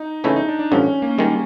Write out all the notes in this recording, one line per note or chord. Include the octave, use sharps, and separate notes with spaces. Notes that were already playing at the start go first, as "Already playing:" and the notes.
Already playing: D#4
C#3 E3 A3 C#4 D#4 E4
D#4
D4
D4
A1 G2 D3 F3 C#4
A#3
D#3 G3 G#3